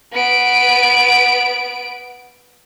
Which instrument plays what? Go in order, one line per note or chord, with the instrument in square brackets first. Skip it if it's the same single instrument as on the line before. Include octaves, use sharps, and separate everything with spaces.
[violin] B3 D7